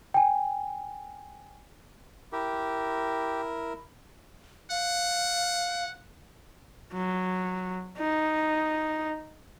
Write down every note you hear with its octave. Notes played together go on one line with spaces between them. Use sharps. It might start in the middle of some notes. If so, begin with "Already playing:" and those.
G5 G#5
E4 G4 A#4
F5 F#5
F#3
D#4